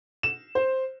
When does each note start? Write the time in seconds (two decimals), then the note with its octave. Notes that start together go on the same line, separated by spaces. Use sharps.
0.23 E7
0.55 C5